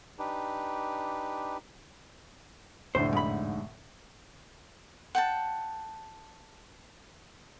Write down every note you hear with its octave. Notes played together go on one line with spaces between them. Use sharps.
D4 D#4 G4 B4
F1 A2 D3 C5
G#2 B5
F#5 G5 A5